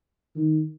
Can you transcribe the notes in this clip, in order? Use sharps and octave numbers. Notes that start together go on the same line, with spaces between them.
D#3